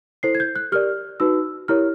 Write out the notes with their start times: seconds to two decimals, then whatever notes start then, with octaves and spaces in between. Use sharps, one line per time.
0.23 E4 A4 C5 C7
0.35 G#6
0.40 G6
0.56 F#6
0.72 G4 A#4 D5 F6
1.20 D#4 F#4 B4 E6
1.68 E4 G4 A#4 C#5 F6